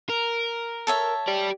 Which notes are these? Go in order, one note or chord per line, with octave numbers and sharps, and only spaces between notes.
A#4
A4 C#5 E5
G4 D5